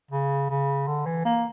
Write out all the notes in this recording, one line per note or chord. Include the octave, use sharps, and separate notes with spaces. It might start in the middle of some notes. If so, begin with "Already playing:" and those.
C#3
C#3
D3
E3
A#3